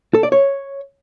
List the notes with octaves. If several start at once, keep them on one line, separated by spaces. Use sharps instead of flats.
A4
D5
C#5